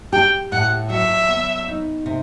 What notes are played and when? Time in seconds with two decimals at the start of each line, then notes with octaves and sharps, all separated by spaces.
0.13 G4 G5
0.52 A2 F#5
0.90 F#3 E5
1.29 B3
1.68 D#4
2.06 C3